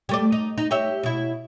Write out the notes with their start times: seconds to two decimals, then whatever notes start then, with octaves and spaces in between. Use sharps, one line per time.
0.09 G3 A3 D5
0.32 D#4
0.58 D#4
0.71 G4 C#5 E5
1.03 B2 E4